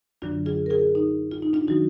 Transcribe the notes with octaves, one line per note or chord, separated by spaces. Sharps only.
F#2 D3 F#3 D4 F4
F4 G#4
A#4
F4 G#4
D#4
F4
D#4
D4 F4
D#3 F#3 D#4 F#4